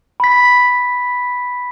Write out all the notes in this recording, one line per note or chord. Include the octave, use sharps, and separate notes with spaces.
B5 B6